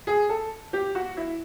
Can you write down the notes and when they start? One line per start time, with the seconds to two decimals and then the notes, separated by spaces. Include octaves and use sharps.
0.07 G#4
0.29 A4
0.73 G4
0.95 F#4
1.17 E4